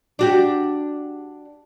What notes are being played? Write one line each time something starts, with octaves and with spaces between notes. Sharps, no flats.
D4 F#4 G4